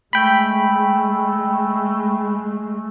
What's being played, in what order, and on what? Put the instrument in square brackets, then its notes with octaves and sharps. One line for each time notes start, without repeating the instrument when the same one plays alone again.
[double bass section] G#3 [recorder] A3 [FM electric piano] G5 B5